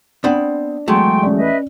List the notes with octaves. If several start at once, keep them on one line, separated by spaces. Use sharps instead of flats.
B3 C4 D4 B5
E2 F#3 G#3 A3 G5 C6 C#6
C#4 D5
B4 D#5 E5